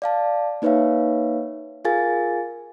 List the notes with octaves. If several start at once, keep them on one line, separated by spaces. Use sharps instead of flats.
D5 F5 A5
A#3 D#4 B4 C#5 E5 F5
F4 G#4 A#4 F5 G#5 A6